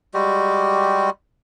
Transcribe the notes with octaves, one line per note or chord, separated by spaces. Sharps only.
G3 G#3 F#4 G4